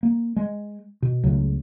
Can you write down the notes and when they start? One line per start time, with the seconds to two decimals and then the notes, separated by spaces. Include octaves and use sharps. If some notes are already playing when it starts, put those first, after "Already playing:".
0.03 A#3
0.37 G#3
1.02 B2
1.23 C#2 C#3 F#3 A3